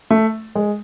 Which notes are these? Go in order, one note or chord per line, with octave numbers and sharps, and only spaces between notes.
A3
G#3